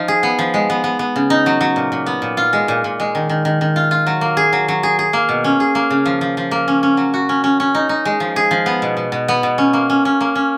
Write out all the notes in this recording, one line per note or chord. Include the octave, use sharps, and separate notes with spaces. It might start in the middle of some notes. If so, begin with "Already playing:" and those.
Already playing: F3 D#4
G#4
B3
F3
G#3
B3
B3
B3
C#3
D#4
F#3
F#3
A#2
A#2
B3
A#2
F4
G#3
A#2
A#2
G#3
D#3
D#3
D#3
D#3
F4
F4
F#3
A#3
G#4
F#3
F#3
G#4
G#4
A#3
B2
C#4
G#4
A#3
C#3
F3
F3
F3
A#3
C#4
C#4
F#3
F#4
C#4
C#4
C#4
D#4
D#4
G#3
F3
G#4
F3
B3
B2
B2
B2
B3
B2
C#4
A#3
C#4
C#4
A#3
C#4